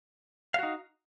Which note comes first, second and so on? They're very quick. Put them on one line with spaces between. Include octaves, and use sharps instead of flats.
F5 F#4 D#4